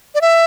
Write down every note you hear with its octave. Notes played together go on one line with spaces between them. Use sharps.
D5
E5